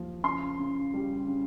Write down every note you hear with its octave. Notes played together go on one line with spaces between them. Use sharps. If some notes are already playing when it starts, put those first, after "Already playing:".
Already playing: D#2 F3
C#3 C6
C#3
G3
C#3